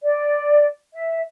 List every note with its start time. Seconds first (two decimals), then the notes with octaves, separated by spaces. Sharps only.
0.03 D5
0.93 E5